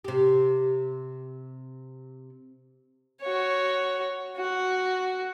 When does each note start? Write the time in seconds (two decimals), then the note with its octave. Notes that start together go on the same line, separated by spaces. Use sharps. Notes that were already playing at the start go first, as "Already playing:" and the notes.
0.04 C3 G4
3.22 F#4 C#5
4.37 F#4